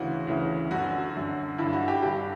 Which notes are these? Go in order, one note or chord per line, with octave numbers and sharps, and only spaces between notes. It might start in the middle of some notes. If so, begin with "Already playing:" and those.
Already playing: D2 C#3 E3 F#4
D2 C#3 E3
F#2 D3 F#4
F#2 D3
G2 D3 E4
F#4
G4
G2 D3 G4